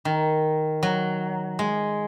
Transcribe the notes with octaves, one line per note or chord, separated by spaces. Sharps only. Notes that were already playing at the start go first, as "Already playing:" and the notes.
D#3
F#3
G#3